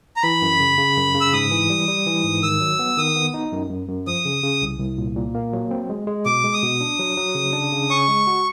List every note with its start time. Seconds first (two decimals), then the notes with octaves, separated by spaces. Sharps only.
0.16 A#5
0.23 E3 B5
0.42 F#2
0.60 C#3
0.78 C#3
0.97 F#2
1.15 C#3
1.21 E6
1.33 G#2 D#6
1.52 E3
1.70 G3
1.88 G3
2.06 E3
2.24 G#2
2.42 D#3 E6
2.61 F#3
2.79 B3
2.98 D#3 D#6
3.16 B3
3.34 D#4
3.52 F#2
3.70 F#2
3.88 F#2
4.07 F3 D#6
4.25 C#3
4.43 C#3
4.62 C2
4.79 C2
4.98 A#2
5.16 A#2
5.35 A#3
5.53 F#3
5.71 C4
5.90 G#3
6.07 G#3
6.25 B2 D6
6.44 G#3
6.54 D#6
6.63 B2
6.81 D4
6.99 F#3
7.17 F#3
7.35 C#3
7.53 D4
7.72 C#3
7.90 C#4 C#6
8.08 G#3
8.27 F#4